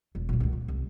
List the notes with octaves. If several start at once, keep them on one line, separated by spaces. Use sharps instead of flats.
E1
B1 B2
C#2 G2
A#3
C2